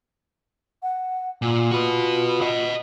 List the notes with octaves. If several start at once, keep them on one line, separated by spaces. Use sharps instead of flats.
F#5
A#2 F4
F#4 B4
D#5 F#5